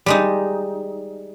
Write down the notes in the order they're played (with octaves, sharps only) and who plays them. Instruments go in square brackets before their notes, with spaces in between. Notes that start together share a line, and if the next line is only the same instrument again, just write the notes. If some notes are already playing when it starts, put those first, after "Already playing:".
[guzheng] G3 G#3 D#4